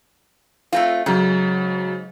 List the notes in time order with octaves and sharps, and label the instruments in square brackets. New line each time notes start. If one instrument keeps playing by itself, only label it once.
[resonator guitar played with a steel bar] A3 C4 F4
[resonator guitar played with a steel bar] G#2 [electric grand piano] C#3 F#3